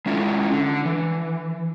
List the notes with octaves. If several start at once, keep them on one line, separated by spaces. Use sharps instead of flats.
G#3 C#4 D4 E4 F4 A4
D3
E3